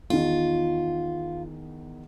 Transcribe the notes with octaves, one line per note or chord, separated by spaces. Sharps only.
E2 D#3 F4